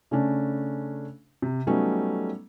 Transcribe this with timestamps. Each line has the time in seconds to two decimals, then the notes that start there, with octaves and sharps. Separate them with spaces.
0.11 C#3 A3 C#4 D4
1.42 C3
1.67 F#3 G3 A3 B3 C#4 D#4